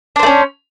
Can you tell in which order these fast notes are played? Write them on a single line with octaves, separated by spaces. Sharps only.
D4 C5 A3 C#4